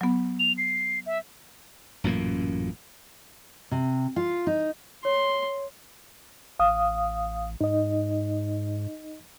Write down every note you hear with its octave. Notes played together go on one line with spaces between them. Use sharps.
F#3 B3
F7
C7
E5
A1 F#2 A#2 A#3
C3
F4
D#4
C#5 C6
A1 F5 D#6
G#2 D#4 D#5